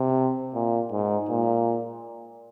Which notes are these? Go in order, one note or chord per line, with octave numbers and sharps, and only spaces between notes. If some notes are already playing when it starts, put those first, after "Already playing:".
Already playing: C3
A#2
G#2
A#2